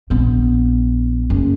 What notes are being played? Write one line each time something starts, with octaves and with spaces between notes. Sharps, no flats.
A#1 B3
F#1